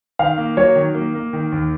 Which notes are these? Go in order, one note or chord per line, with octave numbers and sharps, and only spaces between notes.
D#3 F5
A#3
F#3 C#5
D#3
A#3
A#3
D#3
D#2